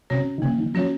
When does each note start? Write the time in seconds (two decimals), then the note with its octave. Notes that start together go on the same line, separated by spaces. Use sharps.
0.10 C3 C#4 F#4 C#5
0.38 D#3
0.42 C#3 A#3
0.58 D#3
0.74 F3 C#4 F#4 C#5